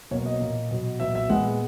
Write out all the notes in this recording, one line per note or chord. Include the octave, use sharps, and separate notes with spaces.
B2 F#3 A#3 C#5
D#5
A#2 A#3
B2 F#3 B3
A#2 F#3 B3 E5
E5
A#2 G#3 B3 F#5